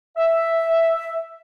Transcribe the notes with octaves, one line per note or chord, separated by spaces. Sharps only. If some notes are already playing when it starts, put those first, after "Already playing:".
E5